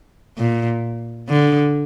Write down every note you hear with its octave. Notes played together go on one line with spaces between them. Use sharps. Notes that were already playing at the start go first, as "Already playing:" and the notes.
A#2
D3